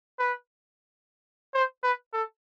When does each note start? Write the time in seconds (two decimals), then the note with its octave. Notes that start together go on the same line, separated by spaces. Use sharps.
0.19 B4
1.54 C5
1.83 B4
2.13 A4